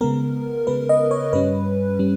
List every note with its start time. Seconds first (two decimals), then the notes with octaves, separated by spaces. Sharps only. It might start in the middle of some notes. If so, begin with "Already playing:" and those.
0.01 C#3 G#3 B3 A#4
0.67 C#3 G#3 B3 B4
0.89 D#5
1.11 C#5
1.33 G2 G3 C#4 B4
1.99 G3 C#4